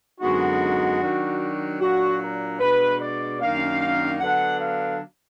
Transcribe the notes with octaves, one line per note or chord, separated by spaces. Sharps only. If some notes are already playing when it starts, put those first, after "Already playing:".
F#2 D3 G#3 B3 D#4 F#4
D#3 F#3 D4
A#2 F#3 D4 F#4
A#4
B2 G#3 D4 B4
D5
F#2 D#3 A#3 D4 F5
D3 F#3 B3 D4 F#5
F5